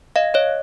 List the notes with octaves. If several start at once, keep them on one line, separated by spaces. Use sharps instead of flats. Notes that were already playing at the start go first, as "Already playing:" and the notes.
D#5 F5
C#5 D#5